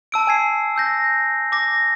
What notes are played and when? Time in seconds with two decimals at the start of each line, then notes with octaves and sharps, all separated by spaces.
0.12 A5 E6 D7
0.27 G#5 G#6 C7
0.76 E6 G6 A#6
1.52 D6 A#6